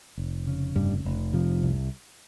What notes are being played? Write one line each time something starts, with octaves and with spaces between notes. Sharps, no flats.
F1
C#3
F1 G2 G3
F1
C3 F3
C2